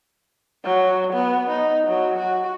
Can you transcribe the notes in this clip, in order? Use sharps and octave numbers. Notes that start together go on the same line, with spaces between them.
F#3
B3
D#4
F#3
F#4